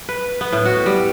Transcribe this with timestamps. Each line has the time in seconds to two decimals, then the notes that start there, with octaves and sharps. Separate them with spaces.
0.09 B4
0.41 B3
0.52 A2
0.65 F#4
0.86 G3